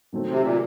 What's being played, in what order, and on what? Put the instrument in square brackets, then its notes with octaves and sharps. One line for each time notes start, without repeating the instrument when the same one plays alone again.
[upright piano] D#3 F#3 A3 C4
[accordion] C3
A#2